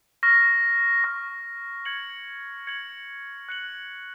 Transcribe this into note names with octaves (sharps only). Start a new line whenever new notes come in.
C#6 F6 A#6
C#6 F6 A#6
G#6 C#7 F#7
G#6 C#7 F#7
F#6 C#7 F#7